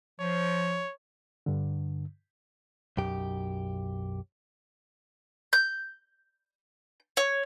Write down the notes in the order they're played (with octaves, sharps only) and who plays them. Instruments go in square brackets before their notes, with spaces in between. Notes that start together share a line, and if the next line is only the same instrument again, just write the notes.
[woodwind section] F3 [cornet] C#5
[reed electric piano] G2 D3
[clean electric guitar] B1 F#2 G4
[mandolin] G6
C#5